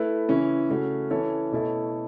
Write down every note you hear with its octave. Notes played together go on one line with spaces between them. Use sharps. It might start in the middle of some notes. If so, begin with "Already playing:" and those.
Already playing: A3 E4 B4
C#3 E3 C#4 E4
C#3 A3 C#4 F#4
E3 C#4 E4 A4 C#5
B2 A3 E4 A4 C#5